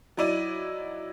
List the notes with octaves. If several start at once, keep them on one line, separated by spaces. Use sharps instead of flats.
F#3 D#4 E4 D5 D#7